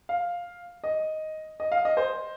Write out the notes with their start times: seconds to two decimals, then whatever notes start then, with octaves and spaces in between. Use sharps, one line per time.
0.09 F5
0.84 D#5
1.60 D#5
1.72 F5
1.85 D#5
1.97 C5